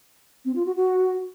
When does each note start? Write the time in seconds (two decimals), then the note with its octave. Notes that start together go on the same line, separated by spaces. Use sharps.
0.45 C4
0.55 F4
0.66 F#4
0.76 F#4